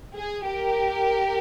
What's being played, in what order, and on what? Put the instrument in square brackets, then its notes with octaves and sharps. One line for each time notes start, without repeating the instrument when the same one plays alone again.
[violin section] G#4
G4 A#4